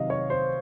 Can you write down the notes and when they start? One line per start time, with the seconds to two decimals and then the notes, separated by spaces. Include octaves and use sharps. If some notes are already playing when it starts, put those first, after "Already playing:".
Already playing: C3 D#3 F#3 D#5 F5
0.10 C#5
0.30 C5